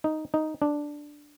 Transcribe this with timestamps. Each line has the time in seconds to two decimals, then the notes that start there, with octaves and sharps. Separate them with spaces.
0.04 D#4
0.34 D#4
0.62 D4